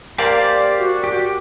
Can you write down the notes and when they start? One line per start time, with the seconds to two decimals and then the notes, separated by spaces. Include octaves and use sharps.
0.18 A#3 G4 C5 D5 F5
0.78 F#4
1.04 G4